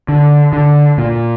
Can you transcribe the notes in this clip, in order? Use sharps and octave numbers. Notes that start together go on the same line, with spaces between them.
D3
D3
A#2